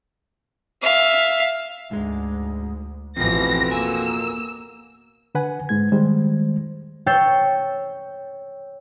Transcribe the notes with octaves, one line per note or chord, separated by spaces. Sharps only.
E5 F5
D2 G#2 G#3
A1 F2 B2 E3 F3 C4 A#6
A#3 G#5 E6
D3 B4 F#5 G#5
G#2 G#3 G#6
D#3 G3 G#3 C5
C#5 G5 E6 G6 A6 C7